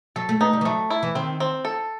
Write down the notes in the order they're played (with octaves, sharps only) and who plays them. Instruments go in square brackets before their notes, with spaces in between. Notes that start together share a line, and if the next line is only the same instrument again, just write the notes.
[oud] F#3 [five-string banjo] A4
[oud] A3
[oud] B3 [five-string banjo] D#4
[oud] G3
E3
[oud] F#3 [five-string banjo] A3
[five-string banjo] E4
[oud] E3
[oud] D#3 [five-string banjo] C4
[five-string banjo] C4
A4